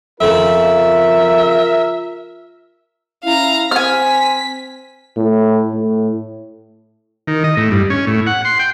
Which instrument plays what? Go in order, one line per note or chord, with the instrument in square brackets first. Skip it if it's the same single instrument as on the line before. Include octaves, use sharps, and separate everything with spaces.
[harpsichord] F2 C#3 [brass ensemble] F4 A#4 [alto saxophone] E5
[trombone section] C#4 E4 [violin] F5 A#5
[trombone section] C4 C5 [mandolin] G#5 F6 [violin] B6
[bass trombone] A2
A2
[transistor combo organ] D#3
D#5
A2
G2
C#4
A2
F#5
C6
G5